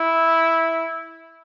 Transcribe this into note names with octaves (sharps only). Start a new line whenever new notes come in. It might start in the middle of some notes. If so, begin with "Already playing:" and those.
Already playing: E4